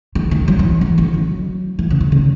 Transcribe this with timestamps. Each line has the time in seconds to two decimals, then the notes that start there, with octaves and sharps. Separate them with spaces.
0.15 D#3
0.31 D#3
0.48 F#3
0.59 E3
0.81 E3
0.98 D#3
1.14 F#3
1.79 E3
1.90 C#3
2.00 C#3
2.12 D#3